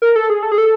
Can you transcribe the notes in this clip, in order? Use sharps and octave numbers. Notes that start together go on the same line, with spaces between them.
A#4
A4
G#4
A4
G#4
A4